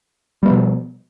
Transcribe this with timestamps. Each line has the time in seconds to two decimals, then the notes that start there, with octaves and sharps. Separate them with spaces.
0.43 G3
0.45 B3
0.48 F3
0.51 B2